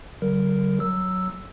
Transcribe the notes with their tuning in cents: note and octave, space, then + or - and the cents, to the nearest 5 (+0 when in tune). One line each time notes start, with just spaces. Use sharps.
D3 -35 F#3 +45 A#4 +0
F#3 +0 E6 +0